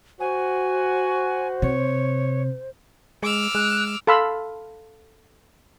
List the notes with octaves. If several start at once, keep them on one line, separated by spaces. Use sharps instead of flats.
F#4 C5 G#5
C3 C#5
G#3 D6 E6 F6
G#3 F#6
A4 F5 B5 C6 E6